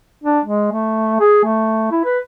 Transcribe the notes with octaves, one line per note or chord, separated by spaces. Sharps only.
D4
G#3
A3
G#4
A3
E4
B4